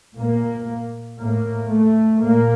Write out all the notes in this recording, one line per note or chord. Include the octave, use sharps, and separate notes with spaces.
A#2 A#3
A2 A#3
A3
A#2 A#3